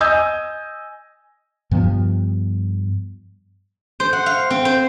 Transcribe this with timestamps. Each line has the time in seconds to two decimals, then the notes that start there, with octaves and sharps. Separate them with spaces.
0.01 D#5 G#5 D#6 E6 G6 G#6
1.71 G2 F3 B3
4.00 C5
4.13 F#5
4.26 F5
4.50 C4
4.65 C5